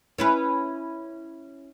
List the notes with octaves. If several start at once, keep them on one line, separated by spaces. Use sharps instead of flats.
C#4 E4 B4